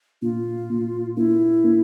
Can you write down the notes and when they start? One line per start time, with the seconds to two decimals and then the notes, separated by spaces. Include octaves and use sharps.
0.22 A#2 F4
0.70 A#2
1.16 A#3 E4
1.64 A#3